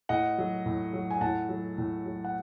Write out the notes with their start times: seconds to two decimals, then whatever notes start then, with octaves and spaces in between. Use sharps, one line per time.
0.09 A2 D#5 F#5
0.38 F#3
0.66 A2
0.93 F#3
1.11 G#5
1.21 A2 F#5 A5
1.49 F#3
1.78 A2
2.06 F#3
2.24 F#5